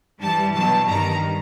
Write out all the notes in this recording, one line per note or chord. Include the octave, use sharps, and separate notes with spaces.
G2 E3 G3 A5
B2 F#3 A5
G2 D#3 G3 A#5